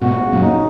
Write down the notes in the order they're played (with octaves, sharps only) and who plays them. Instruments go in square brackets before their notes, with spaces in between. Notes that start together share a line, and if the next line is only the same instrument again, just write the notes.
[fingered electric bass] G#2 B2 [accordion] F#4
[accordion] C#3
[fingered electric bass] F#2 A#2
[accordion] D#4